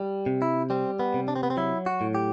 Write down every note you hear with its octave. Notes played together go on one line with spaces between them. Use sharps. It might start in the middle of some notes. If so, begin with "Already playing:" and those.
Already playing: G3
C3
E4
G3 C4
B3
C3
D4
C4
B3
C4
F#3 E4
F#4
A2
G4